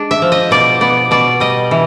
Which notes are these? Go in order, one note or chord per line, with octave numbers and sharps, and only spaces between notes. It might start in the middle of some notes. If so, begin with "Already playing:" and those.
Already playing: G#3 D4
E5
F3
D#5
B2 D5
B3 D5
B2 D5
G3 D#5
E3